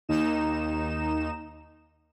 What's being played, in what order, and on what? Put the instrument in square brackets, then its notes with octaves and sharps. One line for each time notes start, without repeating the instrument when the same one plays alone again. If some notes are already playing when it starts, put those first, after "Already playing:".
[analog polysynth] D#2 D#4 E7